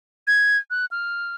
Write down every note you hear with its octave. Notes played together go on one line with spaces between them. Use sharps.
G#6
F#6
F6